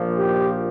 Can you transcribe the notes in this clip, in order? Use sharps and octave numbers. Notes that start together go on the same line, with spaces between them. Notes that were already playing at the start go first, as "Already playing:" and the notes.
Already playing: A#1 A#2 F3
G4